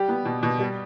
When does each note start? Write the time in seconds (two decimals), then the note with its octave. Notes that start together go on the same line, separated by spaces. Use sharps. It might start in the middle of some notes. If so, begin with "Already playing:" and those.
Already playing: G3 G4
0.09 B3
0.25 B2
0.43 B2
0.59 G3